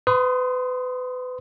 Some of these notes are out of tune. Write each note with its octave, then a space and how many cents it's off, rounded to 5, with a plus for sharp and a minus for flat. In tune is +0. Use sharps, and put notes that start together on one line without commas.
B4 +30 C6 -10 D#6 +5